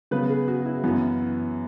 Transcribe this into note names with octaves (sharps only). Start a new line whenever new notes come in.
C#3 F#3 B3 B4
G#4
F#4
E4
F#2 E3 B3